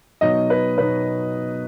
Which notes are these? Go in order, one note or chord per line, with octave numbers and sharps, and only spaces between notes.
B2 F#3 B3 D#4 D#5
B4
B2 F#3 B3 D#4 B4